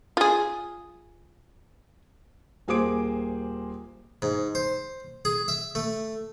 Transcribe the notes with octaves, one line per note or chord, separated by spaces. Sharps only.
F4 G#4
D#1 A#3 G#4 C5 D6 D7
G#2
C5
G#4
E5
A3